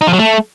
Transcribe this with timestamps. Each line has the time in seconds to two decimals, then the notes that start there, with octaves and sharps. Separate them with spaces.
0.01 D#4
0.07 F3
0.13 F#3
0.19 A3